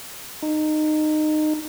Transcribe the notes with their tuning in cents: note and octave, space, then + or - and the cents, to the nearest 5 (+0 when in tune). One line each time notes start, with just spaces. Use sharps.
D#4 -20